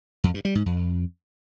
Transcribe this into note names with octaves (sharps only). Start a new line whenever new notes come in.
F2
G2
G3
G#2
F2